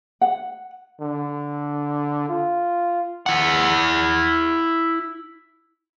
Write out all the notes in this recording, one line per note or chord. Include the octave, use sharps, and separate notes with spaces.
F#5
D3
F4
E4 F#5